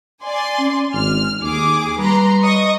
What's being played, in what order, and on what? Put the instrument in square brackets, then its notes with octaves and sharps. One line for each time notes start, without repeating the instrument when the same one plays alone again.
[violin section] D5 G#5 C6
[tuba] C#4
[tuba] G#1 [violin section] F6
[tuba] D#2 [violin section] G#4 D6
[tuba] G3 [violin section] B4 A#5 C6
[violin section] D#5 C#6 D#6